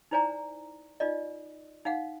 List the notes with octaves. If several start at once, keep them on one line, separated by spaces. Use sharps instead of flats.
D#4 E4 C5 D5 G#5 A#5
D#4 F4 D5 D#5
D#4 F5 F#5